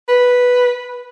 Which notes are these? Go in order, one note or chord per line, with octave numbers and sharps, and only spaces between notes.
B4